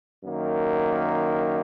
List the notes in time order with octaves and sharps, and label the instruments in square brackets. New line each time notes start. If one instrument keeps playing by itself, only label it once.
[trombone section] F#2 D#3 A#3